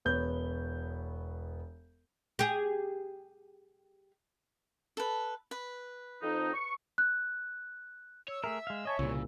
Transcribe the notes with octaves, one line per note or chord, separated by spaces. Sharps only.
E1 B3 C#5 G6
G4 G#4
A4 B4
B4
F2 D#4
C#6
F#6
C#5 E6
A3 G#4 A#4 E5
G#3 F5
C#5 D#5 G#5 A5 C#6
C2 A#2 C#3 E6